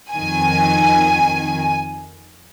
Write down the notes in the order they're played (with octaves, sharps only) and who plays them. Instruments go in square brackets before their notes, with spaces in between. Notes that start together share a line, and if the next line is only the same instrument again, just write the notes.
[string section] F2 D#3 G#5